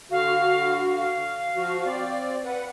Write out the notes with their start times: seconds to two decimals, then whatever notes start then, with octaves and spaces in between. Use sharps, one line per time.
0.11 D3 F#4 F5
0.97 F5
1.55 F3 F#4
1.86 C4 D5
2.45 B4 F#5